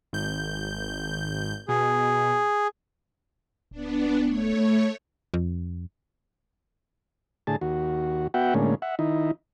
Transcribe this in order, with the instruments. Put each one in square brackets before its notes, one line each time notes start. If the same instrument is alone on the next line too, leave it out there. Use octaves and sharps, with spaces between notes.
[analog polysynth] G#1 G6
[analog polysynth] B2 [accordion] G#4
[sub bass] D1 [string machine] B3 D4
[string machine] A3 C#5
[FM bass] F2
[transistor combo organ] A2 D3 G#4 A5
D#2 F#4
B3 F#4 E5 F#5 G5
A2 D3 G#3 A#3 C#4
E5 F#5
D#3 D#4 E4